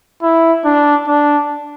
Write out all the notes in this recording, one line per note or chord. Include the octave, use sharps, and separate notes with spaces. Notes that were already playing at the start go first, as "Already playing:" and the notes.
E4
D4
D4